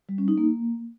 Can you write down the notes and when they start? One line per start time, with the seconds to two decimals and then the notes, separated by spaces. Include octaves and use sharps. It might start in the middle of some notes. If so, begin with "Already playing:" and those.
0.09 G3
0.18 C#4
0.28 D#4
0.38 A#3